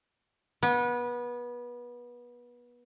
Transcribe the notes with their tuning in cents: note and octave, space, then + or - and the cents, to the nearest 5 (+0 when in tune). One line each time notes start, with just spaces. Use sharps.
B3 -25